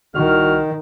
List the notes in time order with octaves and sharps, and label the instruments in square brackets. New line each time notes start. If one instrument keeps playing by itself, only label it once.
[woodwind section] C2 F#4 F6 [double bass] D#3